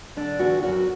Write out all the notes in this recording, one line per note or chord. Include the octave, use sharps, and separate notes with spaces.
D3 D4
E2 F#4
F#2 F#4